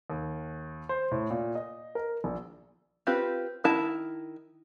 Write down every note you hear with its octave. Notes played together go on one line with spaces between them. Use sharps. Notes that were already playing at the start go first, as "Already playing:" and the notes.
D#2
C5
A2
A#2
D#5
A#4
A#1
C4 F4 G4 B4
D#3 E4 A5